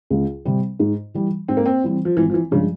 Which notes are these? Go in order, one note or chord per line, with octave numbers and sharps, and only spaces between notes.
C#2
C3 G3 C4
G#2
E3 G3
G#2 C4
A#3
C4
E3 G3 C4
F3
G#1 E3
F3
E3
G2 C#3 F3 G#3